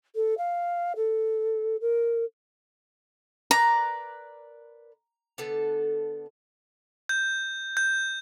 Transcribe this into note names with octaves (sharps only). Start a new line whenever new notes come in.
A4
F5
A4
A#4
A#4 B4 D5 A#5
D3 B3 A4
G6
G6